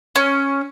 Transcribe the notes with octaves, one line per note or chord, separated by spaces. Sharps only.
C#4